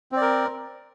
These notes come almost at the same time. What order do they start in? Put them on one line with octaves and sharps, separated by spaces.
C4 D5 A#4